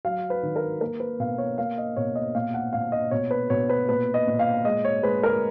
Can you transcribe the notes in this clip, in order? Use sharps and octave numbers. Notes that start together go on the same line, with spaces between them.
F#3 F5
B4
D#3
A#4
A#3 A#4
B4
B2 F5
C#5
A#3 F5
D#5
B2 C#5
D#5
A#2 F5
F#5
A#2 F5
D#5
B2 C#5
B4
B2 C#5
B4
A#2 B4
D#5
A#2
F5
G#3 D#5
C#5
G#3 B4
A#4